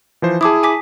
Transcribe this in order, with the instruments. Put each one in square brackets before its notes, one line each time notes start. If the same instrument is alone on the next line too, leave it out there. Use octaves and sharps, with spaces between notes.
[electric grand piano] E3 F3 C5
[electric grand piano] E4 G#4 [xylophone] A5 D6 D#6
[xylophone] G#5 D6 B6